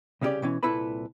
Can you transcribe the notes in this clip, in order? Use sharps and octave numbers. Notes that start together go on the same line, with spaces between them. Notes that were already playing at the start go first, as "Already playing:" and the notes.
C2 C#3 C#4 D4 G4 D5
B2 E3 C#4
C2 A#2 E4 A4 B4 B5